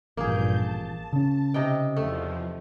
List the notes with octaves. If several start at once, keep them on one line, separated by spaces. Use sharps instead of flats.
A1 G2 A#2 F3 A#3 G#4 G6
A5
C#3 C#4
C3 D#4 G5
E2 F3 A3